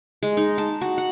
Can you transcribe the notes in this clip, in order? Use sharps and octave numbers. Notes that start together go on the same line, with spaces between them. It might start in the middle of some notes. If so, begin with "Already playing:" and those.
G#3
D#4
A5
F#4
F#5